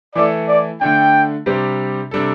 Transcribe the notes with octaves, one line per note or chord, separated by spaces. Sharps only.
E3 A3 E4 A4 D5
D5
D3 A3 D4 G5
C3 G3 D4 G4 C5
C3 G3 D4 A4